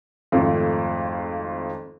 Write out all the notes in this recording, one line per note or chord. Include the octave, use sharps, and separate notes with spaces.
G#1 F2 F3 A3